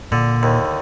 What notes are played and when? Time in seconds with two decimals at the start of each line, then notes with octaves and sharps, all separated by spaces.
0.12 A#2 D3
0.43 D#2